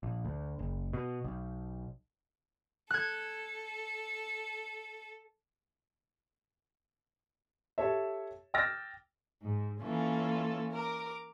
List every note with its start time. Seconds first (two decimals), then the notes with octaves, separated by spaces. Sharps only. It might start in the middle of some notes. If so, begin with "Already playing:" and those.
0.03 A#1
0.25 D2
0.59 F#1
0.93 B2
1.24 B1
2.91 A4 F#6 G#6
7.78 G4 A4 C#5 E5
8.54 G5 D6 E6 F6 A6 A#6
9.41 G#2
9.82 E3 A#3 C#4 F4 A4
10.72 A#4 D6